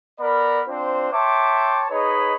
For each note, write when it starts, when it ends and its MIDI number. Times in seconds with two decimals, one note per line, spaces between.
0.20 0.62 59
0.20 0.62 70
0.20 0.62 74
0.20 0.62 83
0.68 1.08 60
0.68 1.08 62
0.68 1.08 65
0.68 1.08 72
1.12 1.85 73
1.12 1.85 76
1.12 1.85 79
1.12 1.85 81
1.12 1.85 84
1.12 1.85 86
1.90 2.34 63
1.90 2.34 68
1.90 2.34 71
1.90 2.34 73
1.90 2.34 75
1.90 2.34 83